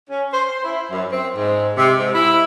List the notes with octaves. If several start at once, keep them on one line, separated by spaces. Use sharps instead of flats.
C#4
C5
C5
E4
F#2
C4
G#2
C3
G#2
E4